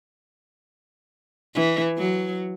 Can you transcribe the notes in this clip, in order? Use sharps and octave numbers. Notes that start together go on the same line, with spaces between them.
E3
F#3